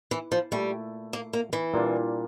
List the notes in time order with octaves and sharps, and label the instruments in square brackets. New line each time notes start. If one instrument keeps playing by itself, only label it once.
[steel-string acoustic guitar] E3
F3
[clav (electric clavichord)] A#2 A3 E4 [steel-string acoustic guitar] G3
[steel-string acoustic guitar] A#3
A#3
E3
[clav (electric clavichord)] A#2 G3 A#3 D4 F4